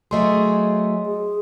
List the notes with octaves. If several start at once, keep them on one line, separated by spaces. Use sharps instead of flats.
F#3 A3 G#4 D#5 C6
G#4